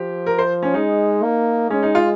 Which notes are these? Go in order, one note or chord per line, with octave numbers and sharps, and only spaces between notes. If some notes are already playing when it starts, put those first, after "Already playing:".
Already playing: F3 G4
A#4
C5
C#4
G#3 D#4
A#3
G#3 C#4
D#4
F4